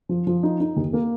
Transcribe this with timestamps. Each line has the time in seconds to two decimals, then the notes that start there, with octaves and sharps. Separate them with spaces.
0.09 F3
0.27 F3
0.43 D#4
0.60 D#4
0.76 D#2
0.93 A#3